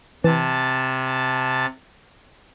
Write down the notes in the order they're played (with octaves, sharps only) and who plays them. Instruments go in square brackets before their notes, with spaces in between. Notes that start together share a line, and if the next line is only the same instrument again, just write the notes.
[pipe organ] C3 A5 [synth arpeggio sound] E3